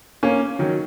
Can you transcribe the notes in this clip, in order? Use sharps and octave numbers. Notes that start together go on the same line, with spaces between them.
A#3 C#4
D#3 F#3